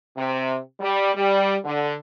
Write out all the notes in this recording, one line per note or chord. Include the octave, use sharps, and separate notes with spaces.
C3
G3
G3
D3